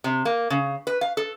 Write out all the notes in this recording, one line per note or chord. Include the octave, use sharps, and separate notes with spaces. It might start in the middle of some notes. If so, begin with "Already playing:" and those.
C3
A#3
C#3
B4
F5
A4